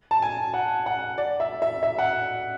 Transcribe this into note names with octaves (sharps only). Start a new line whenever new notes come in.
A5
G#5
F#5
F#5
D5
E5
E5
E5
F#5